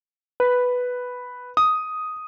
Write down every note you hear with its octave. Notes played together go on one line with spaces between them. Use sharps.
B4
D#6